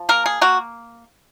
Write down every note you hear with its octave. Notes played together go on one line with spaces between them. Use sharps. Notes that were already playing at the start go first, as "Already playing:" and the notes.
Already playing: F3
A#3 A#4
G#4
A#3 F#4